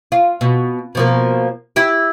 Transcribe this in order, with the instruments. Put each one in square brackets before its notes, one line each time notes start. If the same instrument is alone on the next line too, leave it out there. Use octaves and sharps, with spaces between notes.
[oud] F4
B2
B2 F3 A#3
E4 G4